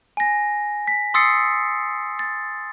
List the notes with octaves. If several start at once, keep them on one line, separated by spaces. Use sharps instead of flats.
G#5 A#6
B6
C6 D#6 E6 A6 C7 C#7
A6